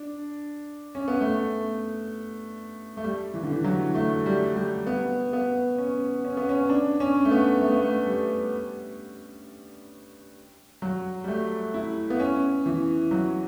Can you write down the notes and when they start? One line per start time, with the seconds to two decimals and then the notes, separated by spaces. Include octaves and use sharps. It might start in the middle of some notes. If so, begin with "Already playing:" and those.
Already playing: D4
0.95 C#4
1.08 B3
1.20 A3
2.97 A3
3.04 G3
3.34 E3
3.43 D3
3.52 E3
3.64 F#3
3.94 A3
4.26 G3
4.56 G3
4.87 B3
5.33 B3
5.78 C#4
6.25 C#4
6.37 B3
6.49 C#4
6.70 D4
7.00 C#4
7.25 A3
7.31 B3
7.62 A3
7.71 B3
7.82 A3
8.07 G3
10.82 F#3
11.24 G3
11.28 A3
11.74 E4
12.10 B3
12.20 C#4
12.66 E3
13.11 F#3